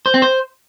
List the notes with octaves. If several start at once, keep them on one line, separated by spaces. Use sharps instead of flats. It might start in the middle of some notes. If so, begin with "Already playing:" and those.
C5
C4
C5